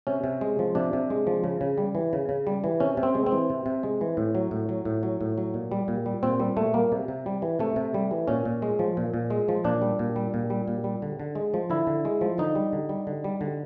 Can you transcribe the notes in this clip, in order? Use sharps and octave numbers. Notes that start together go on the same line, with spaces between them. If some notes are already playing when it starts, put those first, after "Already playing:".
C3 C#4
C3
G#3
F3
C3 D4
C3
G#3
F3
C#3
C#3
G3
E3
C#3
C#3
G3
E3
C3 C#4
C3
C4
G#3
C4
E3
C3
C3
G#3
E3
A2
F#3
A2
F#3
A2
F#3
A2
F#3
A#2
G3
A#2
G3
A#2 C4
G3
A#2 A3
G3 A#3
C3
C3
G3
E3
C3 A3
C3
G3
E3
A#2 C#4
A#2
G#3
F3
A#2
A#2
G#3
F3
A#2 D4
G3
A#2
G3
A#2
G3
A#2
G3
D3
D3
G#3
F3
D3 E4
D3
G#3
F3
D3 D#4
G3
D3
G3
D3
G3
D3